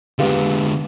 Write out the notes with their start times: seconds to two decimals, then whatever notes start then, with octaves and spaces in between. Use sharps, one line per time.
0.19 D3 G#3 B3 F4 G4